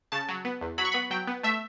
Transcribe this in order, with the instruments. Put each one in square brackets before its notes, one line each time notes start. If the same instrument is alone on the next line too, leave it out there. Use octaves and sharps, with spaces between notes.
[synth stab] C#3 A5
F#3
B3
E2
F#3 B5
C#6
B3 B5
F#3 G5
B3
A3 E5